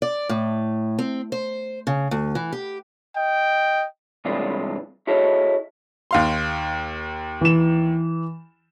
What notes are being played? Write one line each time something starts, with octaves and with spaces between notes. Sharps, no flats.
D5
A2
C4
C5
C#3
D2
E3
G4
D#5 G5
G2 C3 E3 G#3 D4 F4
E4 F#4 G#4 A4 C#5 D#5
D#2 F5 C6
E3 E7